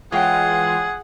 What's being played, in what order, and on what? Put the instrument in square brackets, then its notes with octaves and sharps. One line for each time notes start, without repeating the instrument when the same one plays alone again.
[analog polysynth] E3 G#3 F4 [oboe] G#4 [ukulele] C#5 G5 [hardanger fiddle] F#5